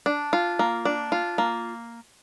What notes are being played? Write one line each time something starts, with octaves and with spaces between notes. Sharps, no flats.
D4
F4
A#3
D4
F4
A#3